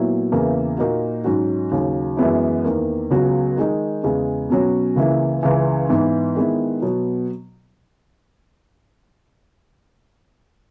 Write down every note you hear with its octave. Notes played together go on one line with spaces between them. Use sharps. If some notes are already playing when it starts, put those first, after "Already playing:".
Already playing: A#2 F#3 B3 E4
E2 C#3 E3 A#3
A#2 A#3 D#4 F#4
G#2 F#3 C#4 F#4
D#2 C#3 F#3
F#2 E3 G#3 B3 E4
E2 D#3 A#3
C#2 C#3 F#3 B3 F#4
D#3 G#3 D#4
E2 C#3 G#3
B2 F#3 C#4 F#4
C#2 C#3 E3 A#3 E4
C#2 C#3 E3
G#2 E3 B3
D#3 G#3 B3 E4
B2 F#3 B3